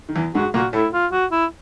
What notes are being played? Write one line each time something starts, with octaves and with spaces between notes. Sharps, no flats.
D#3
E2 E3
G#2 G#3 F#4
A#2 A#3 F#4
A2 A3 E4
F4
F#4
E4